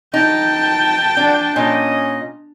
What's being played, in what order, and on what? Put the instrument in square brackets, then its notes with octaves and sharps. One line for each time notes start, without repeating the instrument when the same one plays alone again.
[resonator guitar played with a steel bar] D#4 [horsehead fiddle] G5 A5
[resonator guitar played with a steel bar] D4
[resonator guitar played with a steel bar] A#2 [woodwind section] C#4 D#5